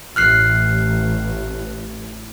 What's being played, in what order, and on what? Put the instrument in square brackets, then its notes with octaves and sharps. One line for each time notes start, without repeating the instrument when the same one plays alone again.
[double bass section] A1 [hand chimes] F6 F#6 C7